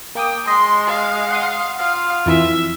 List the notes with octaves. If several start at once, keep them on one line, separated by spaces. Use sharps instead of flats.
A#3 G5 D6 D#6
G#3 D#5 C6
F5
F#5 C6 D#6
F4 F5
F2 E3 E5